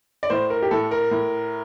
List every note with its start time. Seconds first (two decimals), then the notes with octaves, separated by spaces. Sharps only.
0.23 D5
0.30 A2 C5
0.50 A#4
0.62 G4
0.71 A2 A4
0.91 A#4
1.11 A2